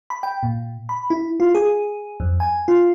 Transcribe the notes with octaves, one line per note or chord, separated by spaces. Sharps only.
B5
G5
A#2
B5
E4
F4
G#4
F2
G#5
F4